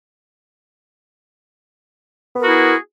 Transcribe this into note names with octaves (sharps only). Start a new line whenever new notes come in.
B3 E4 F#4 G#4 A#4